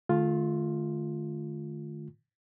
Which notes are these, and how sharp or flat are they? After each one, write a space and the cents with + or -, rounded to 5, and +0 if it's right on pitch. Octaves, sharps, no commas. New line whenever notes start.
D3 +45 A3 -30 F4 +5